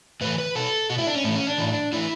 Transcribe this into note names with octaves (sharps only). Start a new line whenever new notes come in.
A2 E3 B4
B4
B2 A4
B2 F#4
E4
D4
C#4
A2 E3 A3
C#4
D4
A2 E3
A2 E3 E4